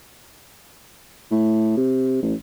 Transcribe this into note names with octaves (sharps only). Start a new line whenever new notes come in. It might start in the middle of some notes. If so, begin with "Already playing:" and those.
A2
C3
A1